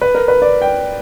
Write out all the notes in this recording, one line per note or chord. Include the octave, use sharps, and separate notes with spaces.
B4
A#4
B4
D5
G5